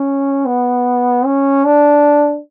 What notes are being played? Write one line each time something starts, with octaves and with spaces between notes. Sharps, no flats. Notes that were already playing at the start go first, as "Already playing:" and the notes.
Already playing: C#4
B3
C#4
D4